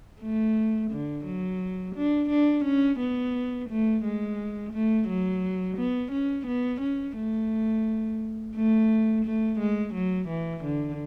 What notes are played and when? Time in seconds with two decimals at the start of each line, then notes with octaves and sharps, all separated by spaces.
0.21 A3
0.91 D3
1.25 F#3
1.95 D4
2.30 D4
2.64 C#4
2.99 B3
3.69 A3
4.04 G#3
4.73 A3
5.08 F#3
5.78 B3
6.12 C#4
6.47 B3
6.81 C#4
7.16 A3
8.55 A3
9.25 A3
9.59 G#3
9.94 F#3
10.28 E3
10.64 D3